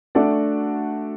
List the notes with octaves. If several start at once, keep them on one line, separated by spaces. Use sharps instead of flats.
A3 D4 F#4 A4 D5